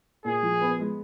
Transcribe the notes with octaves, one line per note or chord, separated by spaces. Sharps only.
A#2 G#4
F3
B3
G#3